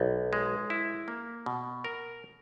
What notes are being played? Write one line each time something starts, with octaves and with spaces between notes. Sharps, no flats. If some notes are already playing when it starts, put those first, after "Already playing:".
Already playing: B1
G#3
E4
A#3
B2
A#4